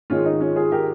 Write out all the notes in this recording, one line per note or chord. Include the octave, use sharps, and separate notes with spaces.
G#2 D#3 G#3 C#4 F4
D#4
C#4 F4
F4 G#4
G4 A#4